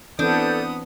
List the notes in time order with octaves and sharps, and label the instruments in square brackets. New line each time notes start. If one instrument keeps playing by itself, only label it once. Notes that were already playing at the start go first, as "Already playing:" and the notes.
[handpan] E3 C4 [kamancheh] B3 D#6 [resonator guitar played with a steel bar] D4 [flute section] A4 G6